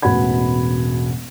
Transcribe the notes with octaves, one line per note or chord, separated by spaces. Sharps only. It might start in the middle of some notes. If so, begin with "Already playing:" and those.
E1 A1 B2 F#5 B5 G#6